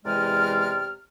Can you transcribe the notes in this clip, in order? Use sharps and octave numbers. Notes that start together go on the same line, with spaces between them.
E2 C3 G#3 D5 F6